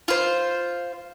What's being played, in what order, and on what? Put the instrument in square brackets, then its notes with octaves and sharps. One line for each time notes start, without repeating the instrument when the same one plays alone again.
[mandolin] F4 C5